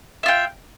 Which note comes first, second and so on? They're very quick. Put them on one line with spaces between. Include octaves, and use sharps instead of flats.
E5 F4 G5